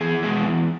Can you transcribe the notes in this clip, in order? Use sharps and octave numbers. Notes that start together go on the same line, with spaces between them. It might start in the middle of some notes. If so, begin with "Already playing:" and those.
E2 G#4
B2 G#3 B3
E2